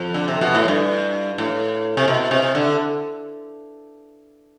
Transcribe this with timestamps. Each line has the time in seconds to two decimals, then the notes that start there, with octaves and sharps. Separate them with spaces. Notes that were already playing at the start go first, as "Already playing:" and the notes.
Already playing: F2
0.14 D3
0.28 C3
0.41 B2
0.55 A2
0.68 G2
1.38 A2
1.97 C3
2.08 B2
2.31 C3
2.55 D3